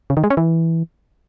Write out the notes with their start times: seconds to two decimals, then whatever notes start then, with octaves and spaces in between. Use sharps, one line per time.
0.10 C#3
0.17 D#3
0.24 G#3
0.30 C#4
0.37 E3